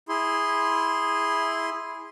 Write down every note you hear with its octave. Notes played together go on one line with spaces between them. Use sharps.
E4 G#4 C6